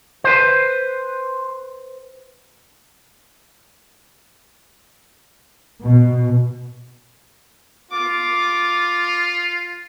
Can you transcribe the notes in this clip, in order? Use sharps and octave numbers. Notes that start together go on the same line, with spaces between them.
B4 C5
B2
F4 D6